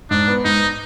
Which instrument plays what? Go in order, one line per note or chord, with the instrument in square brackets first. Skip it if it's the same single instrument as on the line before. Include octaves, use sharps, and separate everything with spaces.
[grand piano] G#2 [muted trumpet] D4
[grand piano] B3
[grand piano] G#2 [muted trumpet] D#4